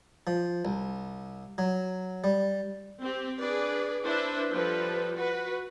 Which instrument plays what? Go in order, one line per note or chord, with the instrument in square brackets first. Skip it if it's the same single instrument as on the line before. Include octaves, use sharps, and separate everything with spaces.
[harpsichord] F3
C2
F#3
G3
[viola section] C4 G4
D4 G#4 B4 D5
D4 E4 B4 C5 E5
F3 G3 A4 B4
F#4 B4